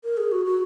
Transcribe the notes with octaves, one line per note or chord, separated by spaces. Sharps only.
A#4
G#4
F#4
F#4